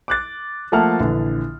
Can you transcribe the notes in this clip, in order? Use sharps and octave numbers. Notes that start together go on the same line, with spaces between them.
D6 F#6 A6
F3 A3 A#3 F#5 A5 F6
A#1 D3 E3